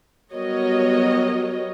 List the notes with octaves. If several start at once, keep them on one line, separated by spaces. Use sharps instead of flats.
F#3 G3 B3 A#4 C#5 D#5